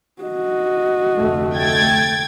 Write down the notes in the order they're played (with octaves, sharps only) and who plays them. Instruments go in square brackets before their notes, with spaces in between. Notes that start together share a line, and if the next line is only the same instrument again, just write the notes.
[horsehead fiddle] F#4 D#5
[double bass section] F1 D2 A3
[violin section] G5 G#6 A6